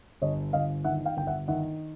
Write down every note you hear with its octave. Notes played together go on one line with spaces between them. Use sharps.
G1 C#5 D#5
G1 D#5 F5
D#3 E5 F#5
F5 G5
G1 G5
E5 F#5
D#3 E5 F#5